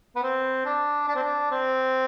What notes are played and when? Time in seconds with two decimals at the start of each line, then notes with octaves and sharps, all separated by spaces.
0.16 B3
0.23 C4
0.65 D4
1.08 D4
1.16 C4
1.23 D4
1.51 C4